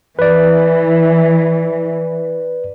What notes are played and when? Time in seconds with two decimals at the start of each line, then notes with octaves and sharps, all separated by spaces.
0.19 E3 B4 D5